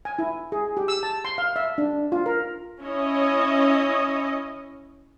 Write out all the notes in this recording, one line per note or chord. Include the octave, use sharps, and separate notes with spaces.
G#5
E4
G#4
G4
E6
A5
C6
F5
E5
D4
F4
A#4
C#4 E4 C#5 D#5